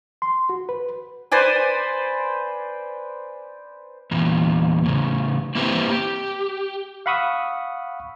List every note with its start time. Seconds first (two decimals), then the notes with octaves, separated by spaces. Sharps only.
0.22 C6
0.49 F#4
0.69 B4
1.32 B4 C5 D5 G#5
4.11 E2 A#2
4.86 A2 C#3
5.55 A#3 C4 E4 G4 B4 C5
5.89 G4
7.06 F5 F#5 B5 C#6 D#6 E6